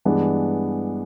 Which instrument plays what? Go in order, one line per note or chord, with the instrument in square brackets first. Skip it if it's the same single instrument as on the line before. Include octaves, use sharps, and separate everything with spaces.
[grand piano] G2 E3 G#3 B3 D4